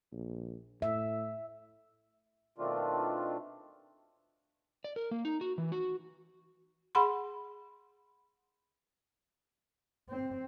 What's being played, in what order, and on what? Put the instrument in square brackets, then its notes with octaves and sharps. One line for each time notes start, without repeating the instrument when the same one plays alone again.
[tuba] A#1
[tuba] A2 [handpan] E5
[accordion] B2 D#3 A3 C4 D4 F4
[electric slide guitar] D5
A#4
A#3
D#4
F#4
E3
F#4
[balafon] G#4 F#5 B5 C6
[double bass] C4